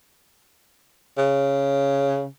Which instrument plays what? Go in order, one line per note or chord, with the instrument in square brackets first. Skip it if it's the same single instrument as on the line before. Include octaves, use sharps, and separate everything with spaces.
[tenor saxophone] C#3